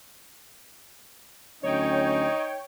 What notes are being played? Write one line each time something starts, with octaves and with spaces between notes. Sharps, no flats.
D2 F#3 C#4 D#4 C#5 G5